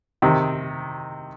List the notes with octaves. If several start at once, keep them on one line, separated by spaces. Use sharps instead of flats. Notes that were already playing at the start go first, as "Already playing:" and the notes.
C3 D#3